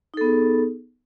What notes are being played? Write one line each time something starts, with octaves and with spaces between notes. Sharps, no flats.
B3 D#4 G#4 A4